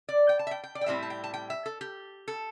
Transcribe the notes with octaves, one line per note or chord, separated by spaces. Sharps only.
D5
G5
A5
E5
G5
G5
D5
G5
A2 G3 C4 E4 E5
A5
G5
A5
G5
E5
A4
G4
A4